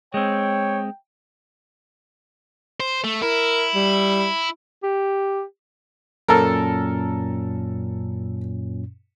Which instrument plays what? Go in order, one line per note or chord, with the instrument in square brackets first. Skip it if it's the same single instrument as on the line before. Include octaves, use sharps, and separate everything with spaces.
[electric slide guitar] G#3 C4 [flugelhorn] C#5 [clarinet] G5
[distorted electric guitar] C5
A3
[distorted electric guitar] E4 [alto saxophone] A#4
[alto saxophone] G3
[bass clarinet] G4
[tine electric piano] F#2 A#2 C#4 [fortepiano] A4 A#4